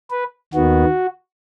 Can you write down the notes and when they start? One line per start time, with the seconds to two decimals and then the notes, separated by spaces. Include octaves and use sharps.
0.10 B4
0.54 D#2 D#3 B3 F#4